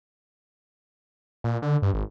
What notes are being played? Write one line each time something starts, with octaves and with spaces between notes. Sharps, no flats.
A#2
D3
G2
G#1